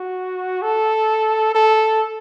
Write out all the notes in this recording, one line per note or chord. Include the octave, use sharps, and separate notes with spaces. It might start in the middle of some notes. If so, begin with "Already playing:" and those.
Already playing: F#4
A4
A4